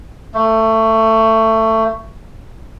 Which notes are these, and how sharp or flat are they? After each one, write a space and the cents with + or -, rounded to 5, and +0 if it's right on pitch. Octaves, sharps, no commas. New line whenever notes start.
A3 +20